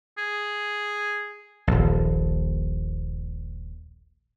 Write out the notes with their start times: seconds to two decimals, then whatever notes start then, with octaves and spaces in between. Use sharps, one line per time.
0.18 G#4
1.67 D#1 A#1